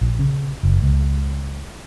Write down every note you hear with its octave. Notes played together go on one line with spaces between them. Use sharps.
A#1
C#3
F#1
C#2